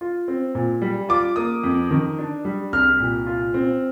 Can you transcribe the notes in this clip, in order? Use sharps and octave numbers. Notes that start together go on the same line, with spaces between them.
F4
C4
A#2
G3
F4 D6
A#3 D#6
F2
D#3
D4
G3
C2 F6
A#2
F4
C4